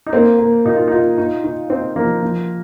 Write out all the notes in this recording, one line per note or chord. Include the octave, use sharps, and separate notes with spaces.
D#4
A#3 C4
A#3
A#2 D#4
F4
D#4 F4
D#4
D#4
C4 D#4
F3 A#3
F3